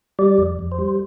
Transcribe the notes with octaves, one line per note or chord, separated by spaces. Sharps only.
G3 D5
F2
F2
C5
G3